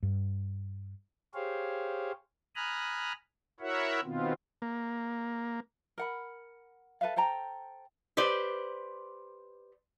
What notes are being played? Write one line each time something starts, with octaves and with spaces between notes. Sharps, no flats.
G2
G4 G#4 C5 C#5 F5
G#5 A#5 B5 D#6 F6 F#6
E4 F#4 A#4 C#5 E5 F#5
B2 D#3 B3 C4 F4
A#3
A#4 F#5 B5
A4 B4 E5 F5
A4 C5 G5 A#5
G4 B4 C5 D5